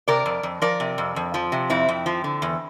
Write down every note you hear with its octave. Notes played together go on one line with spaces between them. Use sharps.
C3 A#4 D5
F2
F2
F3 A#4 D5
C3
F2
F2
F3
C3
F2 C4 E4
F2
F3
D3
E2